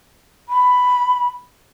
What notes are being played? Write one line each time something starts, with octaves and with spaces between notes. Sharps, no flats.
B5